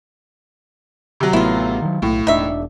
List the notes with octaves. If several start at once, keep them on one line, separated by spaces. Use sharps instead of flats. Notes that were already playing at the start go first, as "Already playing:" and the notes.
C3 F#3
A1 A3 B3 E4 F4
D#3 F#3
B1 A2
E1 D4 D#4 E5